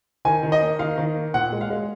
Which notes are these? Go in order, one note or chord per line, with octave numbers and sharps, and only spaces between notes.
D#3 G#5
D#3
D#5
A#3
D#3 F5
D#3
A#3
A#2 F#5
G#3
F5
G#3